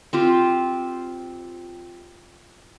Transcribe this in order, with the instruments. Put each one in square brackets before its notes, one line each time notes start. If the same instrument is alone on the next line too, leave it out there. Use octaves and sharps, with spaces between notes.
[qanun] C4 F4 G4